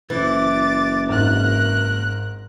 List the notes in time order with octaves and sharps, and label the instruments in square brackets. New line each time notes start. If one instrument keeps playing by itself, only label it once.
[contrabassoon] F#1 [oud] E3 [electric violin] D6 A6
[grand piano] G#1 G#2 [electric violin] A#4 F#6